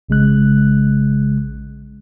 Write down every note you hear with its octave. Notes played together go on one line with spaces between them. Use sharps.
A#1 C#3 G#3 F#6